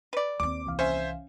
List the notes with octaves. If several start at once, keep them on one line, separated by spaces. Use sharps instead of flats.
B4 D5
D#2 C4 D6
C2 E3 F5
C#4 C5 E5 G#5